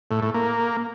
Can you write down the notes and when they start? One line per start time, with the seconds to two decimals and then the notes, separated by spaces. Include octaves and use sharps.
0.11 A2
0.22 A2
0.34 A#3